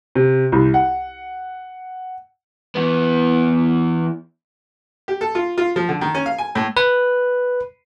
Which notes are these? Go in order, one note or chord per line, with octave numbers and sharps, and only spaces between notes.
C3
C2
F#5
E2 B3
G4
A4
F4
F4
F3
D3
D#3
C#4
F5
G#5
A2
B4